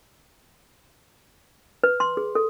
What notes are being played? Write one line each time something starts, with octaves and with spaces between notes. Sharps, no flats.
B4
C6
G#4
A4